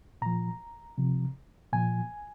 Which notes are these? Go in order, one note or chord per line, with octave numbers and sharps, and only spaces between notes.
A#2 F3 A#5
C3 F3
A#2 F3 G#5